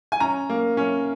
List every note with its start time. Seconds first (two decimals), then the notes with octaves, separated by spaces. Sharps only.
0.12 G#5
0.20 C#4 A#5
0.50 A#3
0.77 C#4